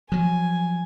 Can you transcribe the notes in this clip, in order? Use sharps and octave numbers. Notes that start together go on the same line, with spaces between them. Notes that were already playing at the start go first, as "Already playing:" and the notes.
F3 F#3 G#5